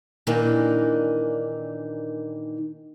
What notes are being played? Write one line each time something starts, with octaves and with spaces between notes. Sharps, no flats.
A#2 D#3 E3 A#3 D4 D#4